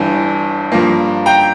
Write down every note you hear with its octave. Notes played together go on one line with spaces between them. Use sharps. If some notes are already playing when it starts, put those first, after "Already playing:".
Already playing: G1 G2 E3 A5
G2 F3 A#3
G5 A#5